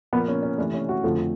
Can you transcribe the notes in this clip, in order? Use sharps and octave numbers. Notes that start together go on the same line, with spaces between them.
A#2 F3 A#3 B3
C#4
C#4
C3 E3 A3 D4
C#4
F#4
F2 D3 F3 A3 F4